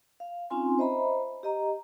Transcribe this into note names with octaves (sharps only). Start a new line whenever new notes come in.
F5
C4 C#4 D#4 F4 G#5 C6
C5 D#5 E5 A#5 B5
G4 D#5 A#5